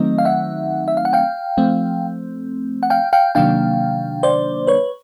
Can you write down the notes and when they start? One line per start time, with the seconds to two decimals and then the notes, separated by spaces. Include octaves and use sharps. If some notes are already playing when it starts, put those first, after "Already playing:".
Already playing: D#3 F#3 A3 C4 D#4 D#5
0.18 F5
0.25 E5 F#5
0.88 E5
0.97 F5
1.05 F#5
1.13 F5 G5
1.57 F3 A3 C4
2.83 F#5
2.90 F5 G5
3.13 F5 G5
3.35 C3 D#3 F#3 A#3 D4 F5 G5
4.23 C5 D5
4.67 B4 C#5